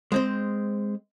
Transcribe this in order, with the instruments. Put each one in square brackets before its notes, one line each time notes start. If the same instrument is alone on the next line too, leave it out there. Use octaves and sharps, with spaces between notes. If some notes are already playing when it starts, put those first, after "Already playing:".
[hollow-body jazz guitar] G#3 C4 C5